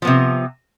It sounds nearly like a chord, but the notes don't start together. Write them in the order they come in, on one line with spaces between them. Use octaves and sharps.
F3 B3 C3